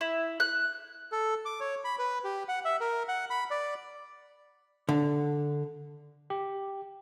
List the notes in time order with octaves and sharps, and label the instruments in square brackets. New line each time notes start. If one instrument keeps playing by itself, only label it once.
[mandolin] E4
F#6
[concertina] A4
D6
C#5
B5
B4
G4
F#5
E5
A#4
F#5
B5
D5
[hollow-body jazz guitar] D3
[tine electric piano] G4